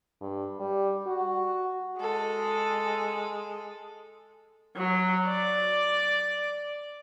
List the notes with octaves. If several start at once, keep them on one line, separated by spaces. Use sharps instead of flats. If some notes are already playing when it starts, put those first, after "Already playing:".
G2
G3
F#4
G#3 A4
F#3
D5